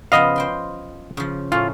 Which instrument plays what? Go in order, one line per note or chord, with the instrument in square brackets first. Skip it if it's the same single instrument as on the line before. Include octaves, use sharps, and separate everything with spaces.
[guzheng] C#3 F3 B3 [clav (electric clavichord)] D#5 F5
[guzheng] C5 G5 C6
C#3 F3
[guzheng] A2 C#4 A4 [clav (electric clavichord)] F4